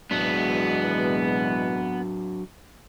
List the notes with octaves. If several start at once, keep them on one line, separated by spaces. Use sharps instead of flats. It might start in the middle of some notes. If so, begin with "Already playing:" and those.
B2 E3 F#3 G#3 B3 D4